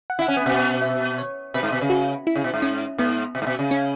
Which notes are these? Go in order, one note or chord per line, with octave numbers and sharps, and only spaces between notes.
F#5
E4
F#5
C#4
B3 G#5
B2 F#5
E5
C#5
B2 B4
G#2
B2
C#3
F#4
E4
C#3
B2
G#2
C#4
G#2 B3
B2
G#2
B2
C#3
C#4